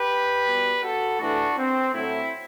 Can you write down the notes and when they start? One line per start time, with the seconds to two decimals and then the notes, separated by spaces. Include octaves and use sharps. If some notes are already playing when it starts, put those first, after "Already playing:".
Already playing: G4 B4
0.46 B2 G3
0.83 F#4 A4
1.19 A2 E3 A3 D4 F#4
1.57 C4
1.94 A2 F#3 A3 C4 E4